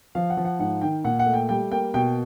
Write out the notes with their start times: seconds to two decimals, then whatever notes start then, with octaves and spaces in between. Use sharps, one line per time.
0.15 F3 F5
0.30 F#5
0.37 F3
0.45 F#5
0.59 G#2 F#5
0.81 D#3 G5
1.04 A#2 F#5
1.19 F#5
1.26 A3
1.34 G5
1.49 G3 G5
1.71 A#3 G5
1.94 B2 G5